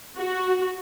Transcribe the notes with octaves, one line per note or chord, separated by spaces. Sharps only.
F#4